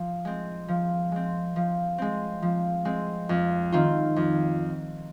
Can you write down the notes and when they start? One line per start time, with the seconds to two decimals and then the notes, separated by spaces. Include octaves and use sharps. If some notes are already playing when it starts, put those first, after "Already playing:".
Already playing: F3
0.25 G#3 C4
0.68 F3
1.12 G#3 C4
1.56 F3
1.98 G#3 C4
2.42 F3
2.85 G#3 C4
3.29 F2
3.72 D#3 C4 F4
4.16 F2